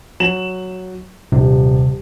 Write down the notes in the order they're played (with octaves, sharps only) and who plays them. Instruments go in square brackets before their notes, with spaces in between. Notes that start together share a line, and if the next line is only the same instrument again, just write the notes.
[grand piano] F#3 E7 F#7
[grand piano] D#1 [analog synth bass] C3